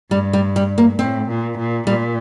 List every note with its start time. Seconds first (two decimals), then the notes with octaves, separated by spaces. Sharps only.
0.11 G2 G3
0.33 G3
0.56 G3
0.78 A#3
0.99 A2 C4
1.28 A#2
1.58 A#2
1.87 A#2 G3